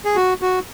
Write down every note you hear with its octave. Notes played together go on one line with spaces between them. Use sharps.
G#4
F#4
F#4